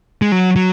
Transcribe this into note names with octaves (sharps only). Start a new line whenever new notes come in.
G#3
F#3
F#3